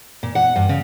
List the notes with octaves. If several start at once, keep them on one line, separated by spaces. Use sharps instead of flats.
A#2
F#5
G2
C#3